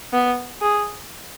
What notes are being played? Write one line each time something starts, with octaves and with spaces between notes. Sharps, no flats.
B3
G#4